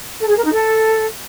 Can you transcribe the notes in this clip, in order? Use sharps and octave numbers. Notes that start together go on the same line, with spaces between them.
A4
G#4
A#4
D#4
A4